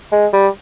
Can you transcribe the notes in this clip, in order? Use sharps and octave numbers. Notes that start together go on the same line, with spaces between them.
G#3
G3